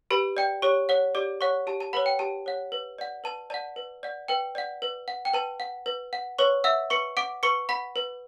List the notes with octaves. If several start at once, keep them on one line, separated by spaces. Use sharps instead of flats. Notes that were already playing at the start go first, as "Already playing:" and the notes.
G4 B4 B5
D5 G5
G4 C#5 C#6
C#5 F#5
G4 D5 D6
C#5 F#5 C#6
G4 A5
A5
B4 C#5 F#5 B5
G5
G4 A5
C#5 F#5
B4
D5 F#5
B4 A5
D5 F#5 A5
B4
D5 F#5
B4 G5
D5 F#5
B4
F#5
G5
B4 A5
F#5
B4
F#5
B4 C#5 C#6
E5 F#5 E6
B4 C#6 C#7
F#5 D6 D7
B4 C#6 C#7
F#5 B5 B6
B4